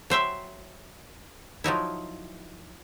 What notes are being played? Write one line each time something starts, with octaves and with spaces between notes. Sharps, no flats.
F#3 C5 E5 G5
F3 F#3 D#4 E4